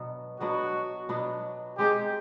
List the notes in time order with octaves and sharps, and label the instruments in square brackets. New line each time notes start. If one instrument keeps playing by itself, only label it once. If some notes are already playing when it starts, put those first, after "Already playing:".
Already playing: [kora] B2 F#3 B3 D4
[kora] B2 F#3 B3 D4 [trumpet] F#4
[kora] B2 F#3 B3 D4
[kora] G#3 C4 D#4 G#4 [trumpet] G4